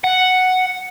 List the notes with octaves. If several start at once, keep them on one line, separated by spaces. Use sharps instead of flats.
F#5